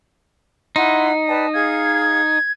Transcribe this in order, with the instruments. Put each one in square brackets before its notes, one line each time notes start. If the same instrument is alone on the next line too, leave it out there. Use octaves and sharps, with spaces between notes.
[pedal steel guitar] D#4 [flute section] E4 F#5 [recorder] C6
[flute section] B4 D5 G5 [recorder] A5
[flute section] G#4 F5 [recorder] G#6